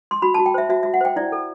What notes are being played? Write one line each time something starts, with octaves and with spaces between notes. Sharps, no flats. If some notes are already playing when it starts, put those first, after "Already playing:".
C6
F#4 B5
A5
F#4
G5
C5 E5
F#4 E5
F#4 E5
F#5
C5 G5
E4 D5
A4